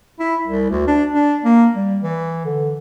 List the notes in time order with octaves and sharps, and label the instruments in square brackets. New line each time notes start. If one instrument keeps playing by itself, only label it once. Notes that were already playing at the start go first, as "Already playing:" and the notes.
[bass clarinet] E4
C2
D2
D4
D4
A#3
G3
E3
D3